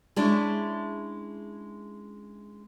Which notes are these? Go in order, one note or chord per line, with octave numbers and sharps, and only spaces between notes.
G#3 C#4 D4 E4